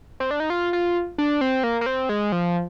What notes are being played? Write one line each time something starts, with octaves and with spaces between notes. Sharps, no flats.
C4
D4
D#4
F4
F4
D4
C4
A#3
A#3
C4
G#3
F3